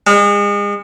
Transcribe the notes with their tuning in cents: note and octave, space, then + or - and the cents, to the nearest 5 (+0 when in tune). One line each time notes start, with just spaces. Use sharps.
G#3 -35